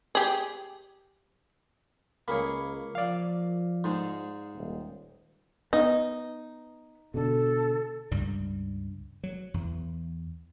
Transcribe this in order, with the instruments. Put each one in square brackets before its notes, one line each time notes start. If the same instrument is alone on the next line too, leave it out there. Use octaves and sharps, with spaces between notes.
[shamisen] G4 G#4
[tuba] C#2 [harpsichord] A#3 G#4 C#5 [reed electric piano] B5
[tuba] F3 [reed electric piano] D5 F5
[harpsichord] G#2 G#3
[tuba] D#1
[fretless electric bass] B3 [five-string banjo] D#4
[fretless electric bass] B2 D3 [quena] A4
[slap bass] C#2 G2 G3
F#3
E2